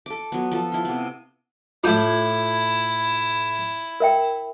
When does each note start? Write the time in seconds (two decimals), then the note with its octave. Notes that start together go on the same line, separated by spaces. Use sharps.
0.06 A4 D6
0.32 F#3 B3
0.51 F3 A4
0.72 E4 F4
0.85 C3 B3
1.84 A2 E4 F4 G5 D6
4.00 A#4 E5 G5